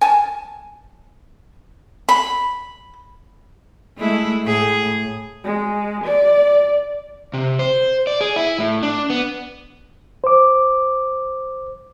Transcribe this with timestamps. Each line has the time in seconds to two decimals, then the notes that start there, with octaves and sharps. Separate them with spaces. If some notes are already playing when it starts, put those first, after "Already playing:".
0.01 G#5 A5
2.09 B5
3.98 G#3 A3 E4
4.44 A2 G#4
5.44 G#3
6.04 D5
7.33 C3
7.59 C5
8.07 D5
8.21 G#4
8.36 E4
8.60 A2
8.83 D4
9.10 B3
10.24 C5 D6